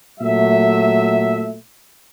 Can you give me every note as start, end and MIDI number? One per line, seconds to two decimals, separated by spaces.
0.20 1.54 46
0.20 1.54 54
0.20 1.54 57
0.20 1.54 76